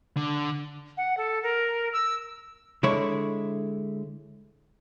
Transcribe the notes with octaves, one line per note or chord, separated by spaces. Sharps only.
D3
F#5
A4
A#4
E6
D3 G#3 E4 C#5